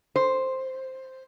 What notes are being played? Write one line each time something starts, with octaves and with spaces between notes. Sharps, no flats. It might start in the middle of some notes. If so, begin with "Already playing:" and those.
C5